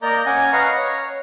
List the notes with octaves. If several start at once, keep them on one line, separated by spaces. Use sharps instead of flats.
A#3 A#4 D5 D#5 A#5 G6
C#4 F#5 G#5
B4 D#5 F5 F#5 A#5 C#6
C#5